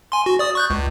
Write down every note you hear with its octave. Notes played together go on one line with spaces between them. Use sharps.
G#5 C6
F#4
D5 D#6
C#6 F#6 G6
C#2